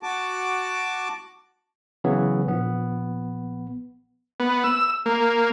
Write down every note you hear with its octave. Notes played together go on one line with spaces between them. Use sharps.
F#4 A5 D6
C#3 E3 F#3 B3
A#1 B3
B3
E6
A#3